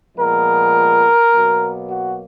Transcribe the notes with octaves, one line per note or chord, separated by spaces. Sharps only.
A#2 F3 G#3 B3 A#4
B2 F#3 A#3
F#4